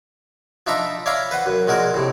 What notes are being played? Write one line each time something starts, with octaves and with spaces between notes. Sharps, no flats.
F3 D4 D#4 E5 A#5 B5
C#5 D5 E5 F5 A#5 B5
B4 C5 F#5
F#2
A#1 G#3 F#4 A#4
A2 C3